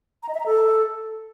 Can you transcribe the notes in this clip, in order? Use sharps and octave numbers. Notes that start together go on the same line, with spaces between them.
A#5
D#5
E5
A#5
A4